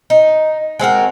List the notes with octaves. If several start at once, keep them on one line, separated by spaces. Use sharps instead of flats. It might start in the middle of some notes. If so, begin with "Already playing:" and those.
D#4
G#3 C4 F#4 A#4